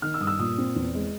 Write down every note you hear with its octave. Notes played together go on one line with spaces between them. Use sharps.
D#3 F6
E6
G2 D#6
E6
A#2 D#6
C4
E2
G#3